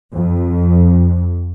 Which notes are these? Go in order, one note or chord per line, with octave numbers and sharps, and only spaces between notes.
F2